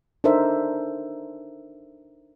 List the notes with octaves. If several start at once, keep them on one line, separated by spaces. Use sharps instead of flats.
D4 D#4 A4 A#4 C5 E5